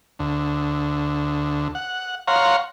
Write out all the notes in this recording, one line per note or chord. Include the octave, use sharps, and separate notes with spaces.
D2
F#5
C#5 F5 F#5 A#5 C6